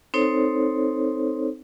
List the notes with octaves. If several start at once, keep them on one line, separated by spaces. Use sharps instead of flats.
C4 D#4 A4 C5 C#5